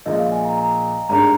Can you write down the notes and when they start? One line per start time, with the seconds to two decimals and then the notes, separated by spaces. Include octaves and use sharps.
0.05 A#1 A#2 F3 G#3 D#5
0.19 F5
0.32 G#5
0.45 A#5
0.58 A#5
1.09 G#1 G2 D#3 G#3 D4 A#5